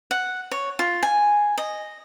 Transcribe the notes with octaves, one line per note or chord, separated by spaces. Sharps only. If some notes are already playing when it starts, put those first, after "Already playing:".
F#5
C#5
F4
G#5
D#5